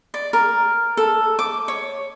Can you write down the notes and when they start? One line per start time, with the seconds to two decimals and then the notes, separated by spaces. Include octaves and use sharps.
0.14 D5
0.33 A#4
0.97 A4
1.39 D6
1.68 C#5